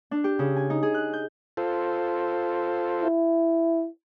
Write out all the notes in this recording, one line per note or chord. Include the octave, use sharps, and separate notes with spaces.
D4
G4
C#3
G#5
D#4
G#4
F#6
G6
F4 A4 C5
E4